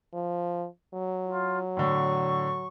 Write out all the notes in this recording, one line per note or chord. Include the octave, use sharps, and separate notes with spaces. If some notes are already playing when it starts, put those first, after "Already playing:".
F3
F#3
F4
A2 D3 C#6